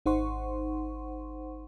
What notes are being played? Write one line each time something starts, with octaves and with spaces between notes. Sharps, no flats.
G#1 D#4 C5 F#5 C6 C#6